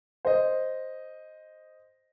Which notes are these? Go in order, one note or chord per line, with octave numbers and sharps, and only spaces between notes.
C5 D#5